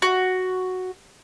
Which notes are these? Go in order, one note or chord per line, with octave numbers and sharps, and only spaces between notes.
F#4